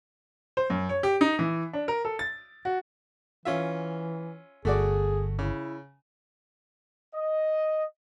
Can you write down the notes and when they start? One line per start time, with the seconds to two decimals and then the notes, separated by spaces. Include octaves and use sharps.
0.57 C5
0.70 F#2
0.89 C#5
1.03 G4
1.21 D#4
1.39 E3
1.73 D4
1.88 A#4
2.05 A4
2.19 A6
2.65 F#4
3.45 E3 C#4 F4 E5
4.65 G1 A3 F#4 G#4 D5
5.39 C#3 E4
7.14 D#5